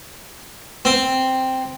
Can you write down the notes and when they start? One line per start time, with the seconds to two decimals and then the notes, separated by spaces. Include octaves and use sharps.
0.85 C4